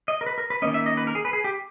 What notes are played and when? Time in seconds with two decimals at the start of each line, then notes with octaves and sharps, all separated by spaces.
0.08 D#5
0.21 A#4
0.26 B4
0.38 A#4
0.50 B4
0.62 D#3 A#3 C#4 D#5
0.74 E5
0.86 D#5
0.97 B4
1.07 A#4
1.15 G#4
1.25 B4
1.33 G#4
1.44 G4